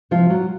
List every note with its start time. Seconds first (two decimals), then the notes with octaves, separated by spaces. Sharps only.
0.11 C3 F3 F4
0.30 F#3